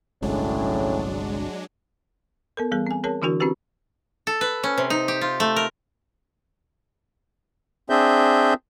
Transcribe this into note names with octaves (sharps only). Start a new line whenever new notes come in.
G1 C2 A2 F#3 G#3 C#4 D4
B3 A4 A#4
E3 G3 B3 G#4
C4 G#5
C4 G#4 A#4 C#5 A5
D3 E3 D4 E4 F#4 A#4
C4 C#4 E4 F#4 G4 B4
A4
B4
C#4
C3
D#4
G4
F4
A3
A#4
C4 D4 G#4 E5 G6